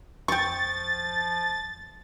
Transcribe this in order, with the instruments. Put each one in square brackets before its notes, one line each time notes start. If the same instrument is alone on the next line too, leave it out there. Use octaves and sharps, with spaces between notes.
[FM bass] F2 [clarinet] F3 [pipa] G5 C#6 [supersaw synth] A6